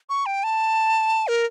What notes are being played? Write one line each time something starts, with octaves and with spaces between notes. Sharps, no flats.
C#6
G5
A5
A#4